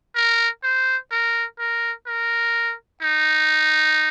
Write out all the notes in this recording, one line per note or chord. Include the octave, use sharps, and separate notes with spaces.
A#4
C5
A#4
A#4
A#4
D#4